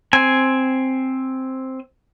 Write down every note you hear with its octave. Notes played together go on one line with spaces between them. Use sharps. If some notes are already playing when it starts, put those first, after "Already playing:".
C4 G#5